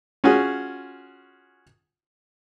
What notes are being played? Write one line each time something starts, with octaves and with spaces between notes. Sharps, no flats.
C#4 F4 F#4 G#4